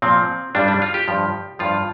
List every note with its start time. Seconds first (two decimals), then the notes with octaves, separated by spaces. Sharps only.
0.02 A#2 F3 C4
0.55 G2 G3 D4
0.68 D4
0.82 F4
0.94 G4
1.08 G2 F3
1.59 G2 F3 F4